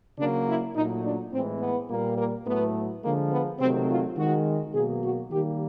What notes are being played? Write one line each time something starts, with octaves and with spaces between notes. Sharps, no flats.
C#3 F#3 A#3 D4
E4
A#2 F#3 A3 D#4
D4
A2 E3 G#3 C4
B3
A#2 G3 A#3
A#3
A2 F#3 A3 B3
D3 F3 G#3 A#3
B3
C3 D#3 F#3 A3 C4
F4
D#3 G#3 F#4
B2 F#3 A#3 G#4
F#4
D#3 G3 A#3 G4